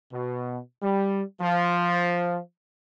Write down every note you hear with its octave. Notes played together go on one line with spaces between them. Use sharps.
B2
G3
F3